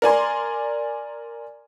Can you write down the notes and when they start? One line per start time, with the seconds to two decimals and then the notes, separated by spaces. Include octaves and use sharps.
0.02 A#4 D5 G#5 C6